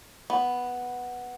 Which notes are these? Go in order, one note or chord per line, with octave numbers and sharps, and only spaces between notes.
B3